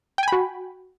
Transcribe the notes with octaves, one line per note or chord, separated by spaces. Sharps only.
F#4 G5 G#5 B5